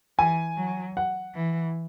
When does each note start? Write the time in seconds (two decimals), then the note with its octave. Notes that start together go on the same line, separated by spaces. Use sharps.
0.18 E3 G#5
0.57 F#3
0.97 F#5
1.35 E3